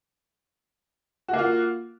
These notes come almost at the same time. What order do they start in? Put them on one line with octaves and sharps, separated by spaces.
F#4 A#3 F4